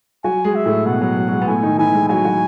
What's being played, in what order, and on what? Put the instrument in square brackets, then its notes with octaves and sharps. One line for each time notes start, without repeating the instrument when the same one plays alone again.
[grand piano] F#3 F#4 [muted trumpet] G#5
[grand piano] G#3 G#4
[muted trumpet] E5
[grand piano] A2 A3
[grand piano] B2 B3 [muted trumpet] F#5
[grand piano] F#3
F#3
F#3
G#3
B3
[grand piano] A2 A3 [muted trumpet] G#5
[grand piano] D#3 D#4
[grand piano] E3 E4 [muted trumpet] G#5
[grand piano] G#3
[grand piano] F#3 F#4 [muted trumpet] G#5
[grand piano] F#3 F#4